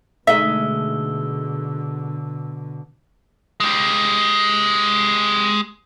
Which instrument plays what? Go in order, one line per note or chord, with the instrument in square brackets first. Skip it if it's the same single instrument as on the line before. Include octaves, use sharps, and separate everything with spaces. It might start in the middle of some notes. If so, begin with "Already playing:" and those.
[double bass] B2 D3 [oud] G#3 A3 D#4 [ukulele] E5 [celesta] E6 G7
[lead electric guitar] G#3 G4